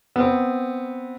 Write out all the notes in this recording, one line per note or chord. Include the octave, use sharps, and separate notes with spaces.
B3 C4